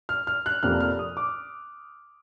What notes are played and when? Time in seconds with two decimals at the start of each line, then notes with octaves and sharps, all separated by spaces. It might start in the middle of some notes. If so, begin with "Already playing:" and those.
0.09 F6
0.27 F6
0.46 F#6
0.63 F1 F2 C3 F3 A#3 F6
0.80 F6
0.99 D#6
1.17 D6